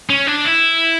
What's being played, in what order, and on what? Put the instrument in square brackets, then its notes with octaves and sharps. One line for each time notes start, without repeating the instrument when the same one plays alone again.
[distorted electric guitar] C#4
D4
E4